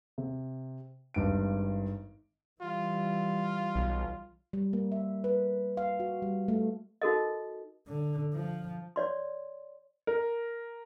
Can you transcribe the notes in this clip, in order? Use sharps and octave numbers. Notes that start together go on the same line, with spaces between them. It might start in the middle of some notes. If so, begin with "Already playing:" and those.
C3
G#1 G2 D7
E3 G3 F4
B1
G3
A#3
E5
B4
F5
F#4
G3
A3
D#4 F#4 A4 A#4 D#5
D3
F3
C#5 D5 C6
A#4